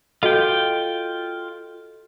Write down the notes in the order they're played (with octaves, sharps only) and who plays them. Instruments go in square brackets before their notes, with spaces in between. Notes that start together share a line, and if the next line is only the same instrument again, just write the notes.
[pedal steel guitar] F4 G5 [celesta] F#4 A4 D#5